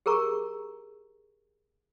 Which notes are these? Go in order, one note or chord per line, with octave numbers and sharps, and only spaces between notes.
G4 G#4 A#4 A#5 C#6